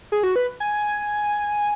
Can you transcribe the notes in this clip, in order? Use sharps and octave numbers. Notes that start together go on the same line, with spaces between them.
G#4
F#4
B4
G#5